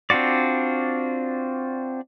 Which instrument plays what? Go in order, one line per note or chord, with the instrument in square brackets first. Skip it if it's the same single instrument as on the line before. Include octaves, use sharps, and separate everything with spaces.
[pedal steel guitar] C4 D4 F4 F#4 D5